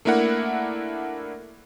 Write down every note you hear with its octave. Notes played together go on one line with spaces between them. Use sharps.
A3 A#3 D4 E4 A#4 F#5